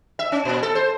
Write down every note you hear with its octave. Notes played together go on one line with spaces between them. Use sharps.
E5
C#4
A#2
A4
C5